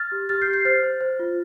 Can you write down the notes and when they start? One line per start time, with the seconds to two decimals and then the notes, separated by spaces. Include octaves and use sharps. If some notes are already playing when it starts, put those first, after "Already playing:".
Already playing: F6 A6
0.12 G4
0.29 G4 F6 A6
0.42 G6 C7
0.47 G4
0.53 G6 C7
0.65 C5 F6 A6
0.83 C5
1.01 C5
1.19 F4